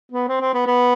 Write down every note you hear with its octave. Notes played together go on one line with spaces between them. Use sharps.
B3
C4
C4
B3
B3